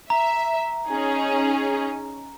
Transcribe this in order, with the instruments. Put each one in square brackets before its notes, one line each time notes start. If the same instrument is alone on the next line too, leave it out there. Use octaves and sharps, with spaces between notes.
[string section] E5 [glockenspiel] A#5
[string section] C#4 D#4 G#4